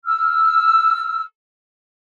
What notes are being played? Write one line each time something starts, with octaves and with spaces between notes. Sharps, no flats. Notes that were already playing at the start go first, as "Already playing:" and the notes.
E6 F6